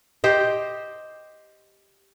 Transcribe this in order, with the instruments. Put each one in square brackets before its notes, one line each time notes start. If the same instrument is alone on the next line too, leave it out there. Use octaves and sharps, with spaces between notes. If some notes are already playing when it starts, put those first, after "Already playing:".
[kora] G4 C5 D#5